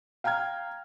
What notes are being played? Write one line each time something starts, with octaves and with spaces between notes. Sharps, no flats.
F5 G5 A#5 F6 G#6